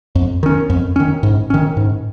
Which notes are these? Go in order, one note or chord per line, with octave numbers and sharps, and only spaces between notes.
F2
D#3 C#4
F2
D#3 C#4
G#2
D#3 C#4
G#2